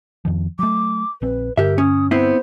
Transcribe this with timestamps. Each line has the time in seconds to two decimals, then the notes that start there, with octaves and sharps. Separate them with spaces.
0.25 F2 D#3 F3
0.59 F#3 A3 D6
1.22 A#1 C4 B4
1.57 G2 D3 G4 A#4 E5
1.78 C#4 D#6
2.11 B3 C4 E4 C5